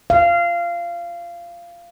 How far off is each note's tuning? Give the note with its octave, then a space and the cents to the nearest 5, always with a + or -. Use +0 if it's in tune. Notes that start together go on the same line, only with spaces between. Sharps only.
F5 -20